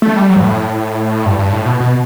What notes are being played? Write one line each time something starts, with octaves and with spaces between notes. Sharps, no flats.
A3
G3
F#3
G2
A2
G2
G2
A2
B2
B2